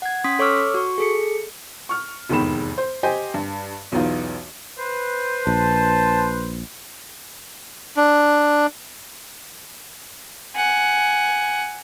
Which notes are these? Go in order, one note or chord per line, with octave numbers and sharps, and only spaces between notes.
F#5 G#6
C#4 C6 D#6 B6
A4 C#5 C#6 D6 E6 F6
F#4 C#6
G#4 A4 C#7
C#6 F6
F1 E2 G#2 D#3 B5 E7
C5
G4 C5 D#5 G5 G#5
G2
B1 E2 E3 D#4 F4
B4 C5
A#1 A5
D4
F#5 G#5